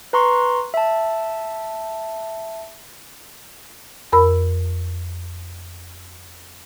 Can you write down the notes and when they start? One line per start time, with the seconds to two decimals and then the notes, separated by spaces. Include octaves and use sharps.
0.13 B4 A#5 C6 C#6
0.74 E5 A5
4.13 F2 A#4 B5 E6